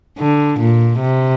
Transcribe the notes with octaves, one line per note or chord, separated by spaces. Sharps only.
D3
A#2
C3